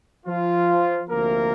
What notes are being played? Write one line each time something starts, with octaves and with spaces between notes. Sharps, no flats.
F3 F4
D2 C3 F3 A#3 A#4